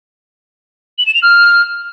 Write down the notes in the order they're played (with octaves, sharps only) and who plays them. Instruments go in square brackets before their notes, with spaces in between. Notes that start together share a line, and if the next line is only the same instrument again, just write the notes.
[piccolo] F#7
E7
F7
F6